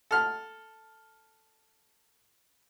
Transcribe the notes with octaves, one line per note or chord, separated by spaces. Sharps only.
A4 F6